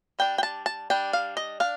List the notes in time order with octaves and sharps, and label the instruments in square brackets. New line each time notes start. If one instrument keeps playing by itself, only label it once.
[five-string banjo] G3 D4 G5
G5
A5
A5
G3 D4 G5
F5
D#5
D4 F5